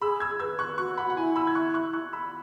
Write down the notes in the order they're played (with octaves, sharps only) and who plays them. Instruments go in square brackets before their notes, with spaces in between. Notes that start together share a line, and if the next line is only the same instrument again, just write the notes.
[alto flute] G#4 [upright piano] B5 E6
[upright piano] E6 G#6
[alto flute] B4 [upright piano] E6 G#6
[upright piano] C#6 F#6
[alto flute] F#4 [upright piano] C#6 F#6
[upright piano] F#5 B5
F#5
[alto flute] E4 [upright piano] G#5
[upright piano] B5 E6
G#6
C#6 F#6
C#6 F#6
C#6 F#6
B5 E6